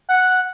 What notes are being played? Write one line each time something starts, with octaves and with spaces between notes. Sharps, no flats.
F#5